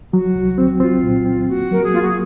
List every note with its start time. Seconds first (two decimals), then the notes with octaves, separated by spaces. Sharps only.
0.13 F#3 F#4
0.35 C2
0.58 C4
0.80 C4 F4
1.03 A#2
1.25 C4
1.48 A#3 F#4
1.71 F#3 A#4
1.82 G#4
1.93 A#3 F4
2.01 F#4
2.08 G#4